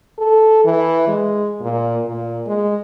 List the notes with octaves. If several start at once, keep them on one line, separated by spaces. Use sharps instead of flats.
A4
E3
G#3
A#2
A#2
G#3